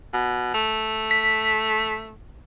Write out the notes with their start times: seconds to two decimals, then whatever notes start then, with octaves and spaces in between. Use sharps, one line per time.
0.13 B2
0.54 A3
1.11 B6